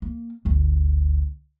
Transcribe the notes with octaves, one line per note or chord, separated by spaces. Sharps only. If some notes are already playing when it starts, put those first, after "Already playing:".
A#3
G1 D2